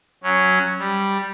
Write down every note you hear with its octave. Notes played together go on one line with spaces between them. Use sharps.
F#3 C#4
G3